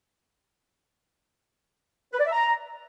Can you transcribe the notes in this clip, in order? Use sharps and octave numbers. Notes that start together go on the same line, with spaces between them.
B4
D5
E5
A#5